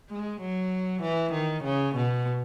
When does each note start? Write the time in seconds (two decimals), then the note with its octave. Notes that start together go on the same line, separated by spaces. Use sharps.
0.10 G#3
0.41 F#3
1.02 E3
1.33 D#3
1.64 C#3
1.96 B2